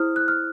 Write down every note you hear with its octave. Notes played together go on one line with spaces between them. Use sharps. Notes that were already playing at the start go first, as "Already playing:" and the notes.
Already playing: E4 G#4 C5 D#6 F6
F#6
F6